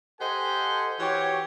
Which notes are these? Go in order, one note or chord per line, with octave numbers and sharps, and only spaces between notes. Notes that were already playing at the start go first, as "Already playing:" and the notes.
G4 A4 C5 D#5 F#5 G#5
E3 F#4 G4 C#5